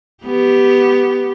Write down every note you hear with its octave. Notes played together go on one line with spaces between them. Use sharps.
B3 G4